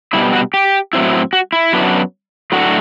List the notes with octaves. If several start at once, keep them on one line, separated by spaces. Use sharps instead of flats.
B2 G3 D4 E4
F#4
G4
A2 F#3 C4 E4
F#4
E4
F#2 F#3 B3 D4
A2 F#3 A3 D4 F#4